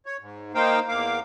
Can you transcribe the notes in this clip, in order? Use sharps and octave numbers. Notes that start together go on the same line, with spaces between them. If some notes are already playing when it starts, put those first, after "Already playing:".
C#5
G#2
A#3 D#4 C5 F5 G5
E2 A#3 F5 D6